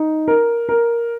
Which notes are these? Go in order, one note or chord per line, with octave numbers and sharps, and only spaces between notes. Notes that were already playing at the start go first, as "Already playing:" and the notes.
Already playing: D#4
A#4
A#4